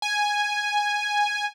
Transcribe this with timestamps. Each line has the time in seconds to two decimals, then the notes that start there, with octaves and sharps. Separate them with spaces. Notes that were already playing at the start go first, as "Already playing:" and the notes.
0.02 G#5